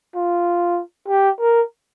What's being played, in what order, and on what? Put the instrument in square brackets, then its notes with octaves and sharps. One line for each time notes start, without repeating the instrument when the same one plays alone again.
[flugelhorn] F4
G4
A#4